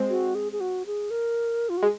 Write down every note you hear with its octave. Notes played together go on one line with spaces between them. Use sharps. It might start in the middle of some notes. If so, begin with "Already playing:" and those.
Already playing: G#3 C4
F#4
G#4
G#4
F#4
G#4
A#4
F4
F#4
G#3